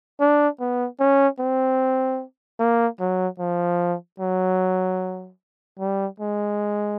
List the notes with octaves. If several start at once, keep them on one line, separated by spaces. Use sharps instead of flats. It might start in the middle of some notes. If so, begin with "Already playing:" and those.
D4
B3
C#4
C4
A#3
F#3
F3
F#3
G3
G#3